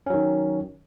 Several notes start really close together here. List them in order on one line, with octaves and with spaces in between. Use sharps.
C#4 F#3 D#3